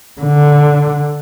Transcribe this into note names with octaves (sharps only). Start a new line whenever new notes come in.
D3